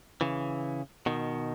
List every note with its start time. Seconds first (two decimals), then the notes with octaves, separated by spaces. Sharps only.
0.21 C#3 E3
1.06 B2 D#3